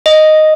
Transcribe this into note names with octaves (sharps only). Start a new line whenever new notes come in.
D#5